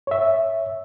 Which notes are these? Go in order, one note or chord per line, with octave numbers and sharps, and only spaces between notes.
C#5 E5